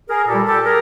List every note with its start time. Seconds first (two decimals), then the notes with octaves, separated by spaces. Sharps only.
0.08 G#4 A#4
0.27 A#2 G3 G4 A4
0.46 G4 A4
0.64 G#4 A#4